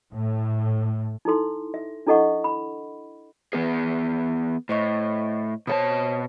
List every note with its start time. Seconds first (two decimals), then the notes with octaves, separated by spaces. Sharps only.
0.13 A2
1.25 D#4 E4 A4 C6
1.74 E5
2.07 D4 E4 A4 D#5 F#5 C#6
2.44 B5
3.53 E3 B3 G#4 B4
4.69 A2 C5 D#5 C#6
5.67 B2 A4 C5 C#5 A5 D#6